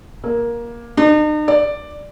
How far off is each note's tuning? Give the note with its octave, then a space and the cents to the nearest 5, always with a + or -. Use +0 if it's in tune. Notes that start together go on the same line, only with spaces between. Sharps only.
A#3 +15
D#4 -45
D5 +5